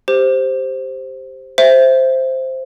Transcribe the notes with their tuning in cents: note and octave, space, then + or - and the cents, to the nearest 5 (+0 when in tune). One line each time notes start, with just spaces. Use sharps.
G4 +0 C5 +0
C5 +0 E5 +5